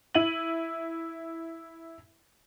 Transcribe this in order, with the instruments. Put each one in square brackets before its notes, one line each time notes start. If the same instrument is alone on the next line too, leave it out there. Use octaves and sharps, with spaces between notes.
[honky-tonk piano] E4 D#7 F#7